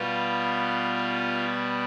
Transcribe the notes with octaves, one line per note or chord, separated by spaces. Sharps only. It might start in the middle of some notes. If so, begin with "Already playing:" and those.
Already playing: B2 G3 B3 F4